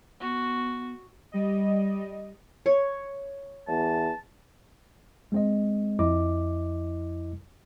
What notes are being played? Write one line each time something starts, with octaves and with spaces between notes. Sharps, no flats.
B3 F#4
G3 D#5
C#5
E2 A5
G#3 C4 D#5
F2 E4 D#5 D6